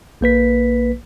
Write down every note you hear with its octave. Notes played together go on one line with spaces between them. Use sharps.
A#1 A#3 B4 B6